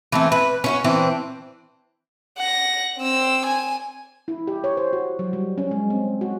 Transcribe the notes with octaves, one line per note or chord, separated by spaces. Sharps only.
E3 A3 C4
B4
C#4 E4 F#4
E3 C4 D4
F#5 A#6
C4 E6
G#5
E4
G4
C#5
C5
F#4
F#3
G3
C#4
G#3
C4
F#4